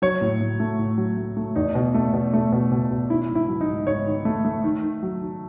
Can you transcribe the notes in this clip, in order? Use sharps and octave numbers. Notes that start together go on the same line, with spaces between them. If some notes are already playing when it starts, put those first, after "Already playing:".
F#3 C#5
A2
A2
A3
A2
F#3
A3
A3
E2 D#4
B2
A3
B2
A3
B2
B2
B2
D#3 E4
G#2
E4
F#3
D#4
G#2
G#2 C#5
D#3
A3
A3
D#3
D#3
F#3
D#3